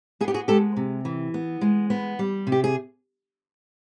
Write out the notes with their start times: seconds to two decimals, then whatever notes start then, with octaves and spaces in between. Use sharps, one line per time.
0.21 B3 G#4
0.28 G4
0.34 F#4 G#4
0.48 G#3 G4 A4
0.77 C3
1.05 E3
1.34 B3
1.61 G#3
1.90 B3
2.19 G3
2.47 C3
2.52 G4
2.64 G#4